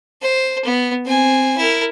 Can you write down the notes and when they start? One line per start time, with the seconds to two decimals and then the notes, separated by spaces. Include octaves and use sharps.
0.22 C5
0.65 B3
1.05 C4 G#5
1.58 E4 A#4